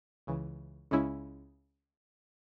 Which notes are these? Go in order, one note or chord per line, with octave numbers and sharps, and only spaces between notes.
C#2 C#3 E3
C#2 C#3 G#3 C#4 E4